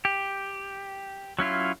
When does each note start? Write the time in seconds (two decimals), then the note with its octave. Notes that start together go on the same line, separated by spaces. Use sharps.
0.05 G4
1.39 F#3 C#4 E4 F4